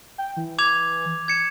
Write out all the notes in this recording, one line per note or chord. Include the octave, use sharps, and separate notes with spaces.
G5
E3
D6 G#6 F7
G#6 C#7 E7